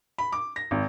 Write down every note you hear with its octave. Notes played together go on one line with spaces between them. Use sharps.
B5
D6
A#6
G#1